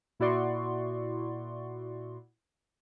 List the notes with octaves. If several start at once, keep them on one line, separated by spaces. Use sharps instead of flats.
A#2 E4 F#4 D5 C6 C#6